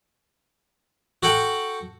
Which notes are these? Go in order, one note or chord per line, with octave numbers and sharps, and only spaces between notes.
F#4 A4 F#5 G5